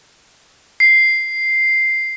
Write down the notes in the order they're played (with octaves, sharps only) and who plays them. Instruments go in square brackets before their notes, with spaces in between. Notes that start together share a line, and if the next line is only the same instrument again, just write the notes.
[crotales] C7